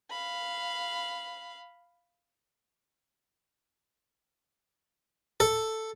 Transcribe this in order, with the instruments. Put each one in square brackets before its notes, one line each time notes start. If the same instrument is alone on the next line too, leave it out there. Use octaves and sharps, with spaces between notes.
[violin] F5 B5
[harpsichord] A4